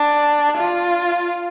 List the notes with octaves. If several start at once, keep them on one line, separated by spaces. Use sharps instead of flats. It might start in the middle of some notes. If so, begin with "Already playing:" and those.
Already playing: D4
F4